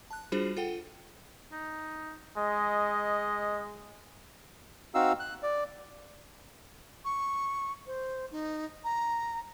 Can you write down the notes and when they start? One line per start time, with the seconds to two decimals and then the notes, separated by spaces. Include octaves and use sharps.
0.11 A5 F#6
0.32 G3 D4 F4 F#4 G#4 C5
0.57 F4 A4 F#5 G5
1.52 D#4
2.37 G#3 D#5
4.94 C4 D#4 F#4 F5 E6
5.20 F#6
5.43 D5
7.05 C#6
7.86 C5
8.32 D#4
8.84 A#5